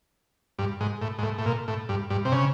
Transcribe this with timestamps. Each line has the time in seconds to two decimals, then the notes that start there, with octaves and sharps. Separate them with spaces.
0.59 G2
0.81 G#2
1.02 A2
1.18 G#2
1.23 A2
1.39 A2
1.46 A#2
1.68 A2
1.89 G2
2.10 G2
2.25 C3
2.32 C#3